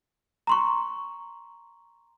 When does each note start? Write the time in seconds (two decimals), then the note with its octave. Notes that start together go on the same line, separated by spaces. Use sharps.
0.47 A#5 C6 C#6